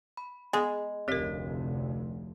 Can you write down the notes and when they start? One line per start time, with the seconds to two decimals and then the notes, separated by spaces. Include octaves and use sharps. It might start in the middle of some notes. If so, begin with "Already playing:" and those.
0.17 B5
0.53 G#3 B3 G#4 F#5
1.08 F1 D2 C4 G4 A#4 C#5 B6